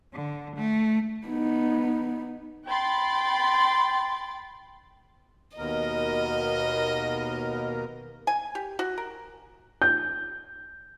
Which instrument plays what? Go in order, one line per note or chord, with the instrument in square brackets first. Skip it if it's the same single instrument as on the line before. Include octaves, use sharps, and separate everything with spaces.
[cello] D3
A3
[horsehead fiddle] B3 D#4
[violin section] G5 B5 C6 A6
[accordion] D#2 B2 A#4 [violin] D#5
[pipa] G#5
G4
F#4
A#4
[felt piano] G6